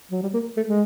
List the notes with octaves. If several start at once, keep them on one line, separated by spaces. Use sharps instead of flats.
F#3
G3
A#3
A3
G#3